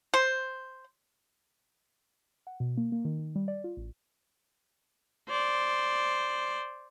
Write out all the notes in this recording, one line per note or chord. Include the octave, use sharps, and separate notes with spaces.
C5
F#5
B2
A#3
A#3
D#3
D#3
G3
D5
F4
A1
C5 D5